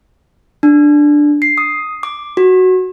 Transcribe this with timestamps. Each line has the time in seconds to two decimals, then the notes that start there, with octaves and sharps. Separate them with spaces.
0.63 D4
1.42 C7
1.58 D#6
2.03 D6
2.37 F#4